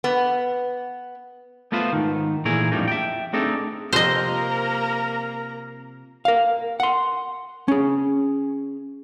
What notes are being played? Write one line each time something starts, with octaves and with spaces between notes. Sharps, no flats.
B3
A3 B3 F4 B4 C5
G#2 D#3
A#2 E3 A3 G#4 A#4
F2 A2 F3 G3 D4 D#4
E5 G5
A3 C4 D4 D#4 G#4 A4
C3 F3 A#3 C4 A#4 C5 D#5 A#5
A#4 F5
F#5 C6
C#4 G#4